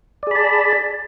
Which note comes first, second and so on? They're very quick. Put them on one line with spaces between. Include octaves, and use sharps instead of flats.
D5 G#4 B5 A5